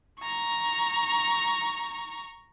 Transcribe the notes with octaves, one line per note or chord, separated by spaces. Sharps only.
A#5 C#6